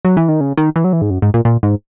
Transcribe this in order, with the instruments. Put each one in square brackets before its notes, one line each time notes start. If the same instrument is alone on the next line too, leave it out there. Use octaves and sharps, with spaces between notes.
[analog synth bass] F#3
E3
D#3
C#3
D#3
E3
F#3
E3
G#2
F#2
G#2
A#2
A#2
G#2